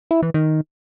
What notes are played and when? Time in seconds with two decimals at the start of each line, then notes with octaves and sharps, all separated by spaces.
0.11 E4
0.22 E3
0.34 D#3